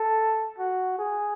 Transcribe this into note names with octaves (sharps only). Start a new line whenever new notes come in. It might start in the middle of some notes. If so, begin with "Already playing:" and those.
Already playing: A4
F#4
G#4